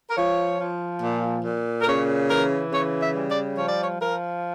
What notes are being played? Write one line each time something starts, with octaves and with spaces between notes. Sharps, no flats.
A#4
F3 C#5
F3
A#2
A#2
A#4
C#3 C#5
E3 A#4
C#3 C#5
E5
G3
D5
F3 C#5
D5
C#5
F3 A#4